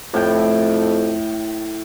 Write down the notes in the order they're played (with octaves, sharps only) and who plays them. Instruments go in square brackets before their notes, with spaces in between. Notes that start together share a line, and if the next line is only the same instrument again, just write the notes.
[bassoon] F2 [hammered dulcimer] A2 G5